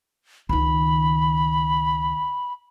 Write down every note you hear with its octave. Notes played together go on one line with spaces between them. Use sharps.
C#2 D#3 B5